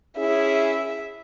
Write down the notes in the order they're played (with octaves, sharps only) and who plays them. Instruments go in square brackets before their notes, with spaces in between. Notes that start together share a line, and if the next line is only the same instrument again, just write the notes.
[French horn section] C#4 E4 G#4 [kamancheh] E5